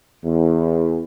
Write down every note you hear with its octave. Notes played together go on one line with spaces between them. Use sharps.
E2